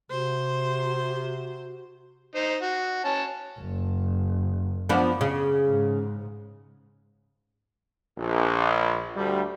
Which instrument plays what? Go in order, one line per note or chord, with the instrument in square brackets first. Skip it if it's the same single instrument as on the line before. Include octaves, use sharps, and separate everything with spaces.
[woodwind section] C3 [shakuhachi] F#4 [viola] C5
[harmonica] D#4 C5
F#4
C#4 A5
[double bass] F#1
[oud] F3 B3 D4
C#3
[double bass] G#2
[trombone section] A#1
D2 G3